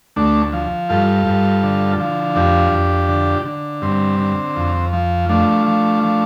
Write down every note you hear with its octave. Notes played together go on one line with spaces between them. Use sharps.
D2 A3 D4
F3
G2 F4 A4
G2
D3
F3
F2 D4 G4
F2
D3
D3
G2 C4
D3
F2
F3
F3 A3 D4
F3
F3